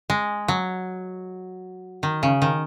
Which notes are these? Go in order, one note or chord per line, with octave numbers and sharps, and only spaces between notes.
G#3
F#3
D#3
C#3
D#3